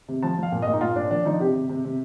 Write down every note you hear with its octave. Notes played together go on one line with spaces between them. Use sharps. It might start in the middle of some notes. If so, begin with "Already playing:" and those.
C3
F3 A5
F3
F5
A#2
A#2 D#5
D#4
A#2 F4
A#2 D4
F3 D4
F3 D#4
C3 G4
C3
C3
C3